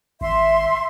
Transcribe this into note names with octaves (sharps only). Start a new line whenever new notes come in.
G#1 E5 C6